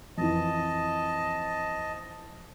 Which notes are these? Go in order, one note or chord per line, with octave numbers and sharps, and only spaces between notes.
F2 E3 D#5 A5